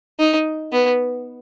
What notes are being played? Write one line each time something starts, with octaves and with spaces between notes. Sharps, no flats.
D#4
B3